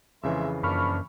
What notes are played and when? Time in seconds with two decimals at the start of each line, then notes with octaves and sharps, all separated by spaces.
0.23 F2 C#3 E3 G#3 E5 C6
0.63 F#2 F3 A#3 D4 B5 C#6 F6